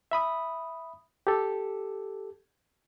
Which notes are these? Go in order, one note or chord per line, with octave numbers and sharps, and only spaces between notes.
E5 B5 D#6
G4 A4